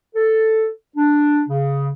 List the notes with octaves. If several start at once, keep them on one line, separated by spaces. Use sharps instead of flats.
A4
D4
C#3